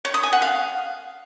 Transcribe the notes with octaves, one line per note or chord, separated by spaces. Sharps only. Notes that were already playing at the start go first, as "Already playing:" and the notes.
C#5
D#6
G#5
F#5
F5